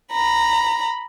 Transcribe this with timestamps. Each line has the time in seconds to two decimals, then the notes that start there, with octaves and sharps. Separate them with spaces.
0.13 A#5 B5